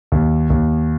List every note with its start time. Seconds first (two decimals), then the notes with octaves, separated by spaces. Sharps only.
0.12 D#2
0.50 D#2